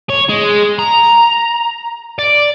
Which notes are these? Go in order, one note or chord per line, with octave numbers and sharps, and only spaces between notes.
C#5
G#3
A#5
D5